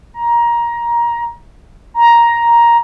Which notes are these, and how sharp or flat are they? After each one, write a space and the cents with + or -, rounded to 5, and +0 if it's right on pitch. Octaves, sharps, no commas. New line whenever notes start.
A#5 +20
A#5 +10